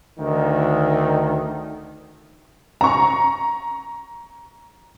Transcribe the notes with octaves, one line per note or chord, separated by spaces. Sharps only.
D2 D#3
A#5 C#6